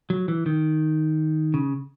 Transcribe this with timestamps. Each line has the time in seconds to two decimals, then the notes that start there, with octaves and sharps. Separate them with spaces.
0.10 F#3
0.28 E3
0.46 D#3
1.54 C#3